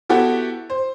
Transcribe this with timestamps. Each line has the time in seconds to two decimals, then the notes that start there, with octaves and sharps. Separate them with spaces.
0.09 B3 E4 F#4 G4 A4
0.70 C5